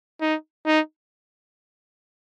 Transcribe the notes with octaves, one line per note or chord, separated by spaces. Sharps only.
D#4
D#4